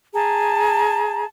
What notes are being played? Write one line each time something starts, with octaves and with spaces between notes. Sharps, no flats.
G#4 A5 A#5